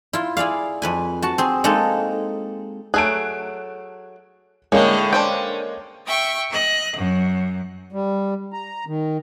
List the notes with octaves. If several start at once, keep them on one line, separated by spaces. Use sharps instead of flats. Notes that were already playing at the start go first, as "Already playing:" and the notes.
E4 F4
E4 G#4 D5 F5
F2 B4 G#5
F#4 A5
C4 G#4
G#3 A#3 D#4 A4
F#3 A3 G#4 F#6 D7
A2 D3 G#3 A#3 C#4
C#4 D4 C5 G5
E5 G5 C#6
D#5 F#6
F#2
G3
A#5
D#3